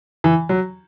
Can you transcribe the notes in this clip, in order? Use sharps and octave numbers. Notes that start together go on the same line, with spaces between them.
E3
F#3